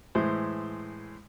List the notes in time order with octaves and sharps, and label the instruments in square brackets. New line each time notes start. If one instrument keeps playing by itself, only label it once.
[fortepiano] A2 E3 G#3 C5